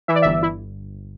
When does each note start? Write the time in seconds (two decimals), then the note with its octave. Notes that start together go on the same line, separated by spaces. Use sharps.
0.08 E3 E5
0.15 D5
0.22 E5
0.25 G1
0.43 E4